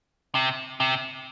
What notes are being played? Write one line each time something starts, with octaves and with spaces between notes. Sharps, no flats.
C3
C3